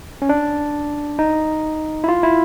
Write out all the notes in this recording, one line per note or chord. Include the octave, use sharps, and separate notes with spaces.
C#4
D4
D#4
E4
F4
E4